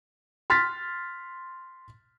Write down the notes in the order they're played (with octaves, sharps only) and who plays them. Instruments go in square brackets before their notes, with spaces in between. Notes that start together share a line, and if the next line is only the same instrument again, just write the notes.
[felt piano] C6 F6 A6 B6